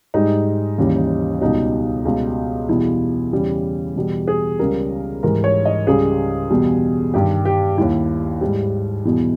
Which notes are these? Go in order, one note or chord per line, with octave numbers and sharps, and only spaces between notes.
G#2 G3 D#4
D#2 C#3 E3 G3
C#2 B2 G3 D#4
C#2 B2 G3
E2 B2 G3 E4
E2 C#3 G3
E2 B2 G3
G#4
C#2 C#3 G3 A#4
G#2 E3 G3 A#4
C#5
D#5
C#2 C#3 G3 G#4
E2 B2 G3
G2 D#3 G3 G4
G4
D#2 D#3 G3 E4
G#2 G3
E2 B2 G3 E4